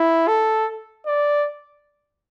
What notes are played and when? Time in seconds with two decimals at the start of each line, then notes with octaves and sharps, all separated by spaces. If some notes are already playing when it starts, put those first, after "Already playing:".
Already playing: E4
0.28 A4
1.06 D5